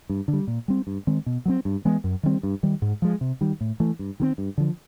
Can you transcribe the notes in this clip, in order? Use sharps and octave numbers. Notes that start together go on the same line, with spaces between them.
G2
D3
G3
A#2
G3 C4
G2
D#3 G#3 C4
B2
F#3 A3 C4
G2
E3 G#3 B3
F#2
D#3 G3 C4
G2
D#3 G3
G#2
F3 G#3
C3
D#3 G3
A2
E3 A3
G2
D#3 G3 C4
G2
D3 F3